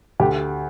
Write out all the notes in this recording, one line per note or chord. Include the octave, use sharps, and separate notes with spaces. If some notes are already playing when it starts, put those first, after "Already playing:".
D2 G4